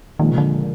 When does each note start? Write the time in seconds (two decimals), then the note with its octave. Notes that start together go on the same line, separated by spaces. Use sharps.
0.19 A#2 D#3 F3 G#3
0.32 C3
0.38 D3